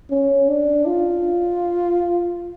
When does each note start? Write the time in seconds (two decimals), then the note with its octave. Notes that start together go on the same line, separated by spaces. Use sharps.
0.10 C#4
0.48 D4
0.86 F4